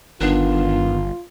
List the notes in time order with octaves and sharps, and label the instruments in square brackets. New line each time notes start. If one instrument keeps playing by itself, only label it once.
[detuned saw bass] G1 [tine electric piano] D#3 B3 [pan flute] D4 [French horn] F4